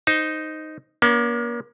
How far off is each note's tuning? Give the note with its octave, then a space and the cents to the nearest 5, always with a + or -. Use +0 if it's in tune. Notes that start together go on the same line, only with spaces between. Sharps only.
D#4 +0 C5 -5
A#3 +35 C#4 +45